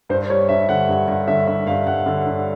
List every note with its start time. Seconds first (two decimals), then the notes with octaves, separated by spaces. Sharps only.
0.09 G2 C5
0.30 G3 C#5
0.49 G2 E5
0.69 D3 F#5
0.89 G2
1.08 G2
1.28 D3 E5
1.48 D3 E5
1.67 G2 F5
1.87 G2 F#5
2.06 D3
2.26 G2